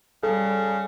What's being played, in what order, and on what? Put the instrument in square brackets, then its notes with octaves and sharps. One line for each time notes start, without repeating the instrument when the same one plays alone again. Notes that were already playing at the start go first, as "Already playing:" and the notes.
[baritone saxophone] C#3 [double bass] G3 [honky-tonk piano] A4